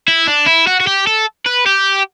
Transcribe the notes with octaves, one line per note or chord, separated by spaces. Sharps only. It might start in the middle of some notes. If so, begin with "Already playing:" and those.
E4
D4
E4
F#4
F#4
G4
A4
B4
G4